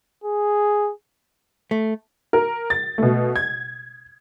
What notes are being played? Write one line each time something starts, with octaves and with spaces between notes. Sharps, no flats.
G#4
A3
A#4
A6
B2 A3
G#6